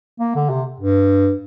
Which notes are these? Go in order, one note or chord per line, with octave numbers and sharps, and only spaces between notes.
A#3
D3
C3
G2